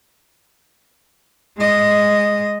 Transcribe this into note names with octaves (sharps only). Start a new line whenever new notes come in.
G#3 D#5